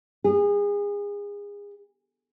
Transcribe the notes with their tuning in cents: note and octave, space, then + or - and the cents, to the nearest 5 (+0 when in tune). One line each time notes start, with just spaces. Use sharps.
G#4 -30